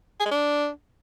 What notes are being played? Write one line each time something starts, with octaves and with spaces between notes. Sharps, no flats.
G#4
G#3
D4